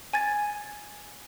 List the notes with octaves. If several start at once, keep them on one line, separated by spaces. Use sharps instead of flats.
G#5 G#6 A6